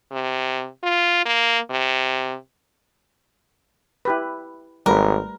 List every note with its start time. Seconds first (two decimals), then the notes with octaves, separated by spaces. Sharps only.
0.12 C3
0.83 F4
1.26 A#3
1.71 C3
4.05 E4 G4 B4
4.86 G#1 G3 A3 A#4 B4